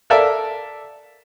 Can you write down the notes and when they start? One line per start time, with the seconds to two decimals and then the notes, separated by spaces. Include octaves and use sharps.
0.10 A4 A#4 D5 E5